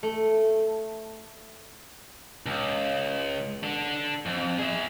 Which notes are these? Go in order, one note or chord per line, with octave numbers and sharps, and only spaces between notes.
A3
C#2
D4 A4
F2
G#4 E5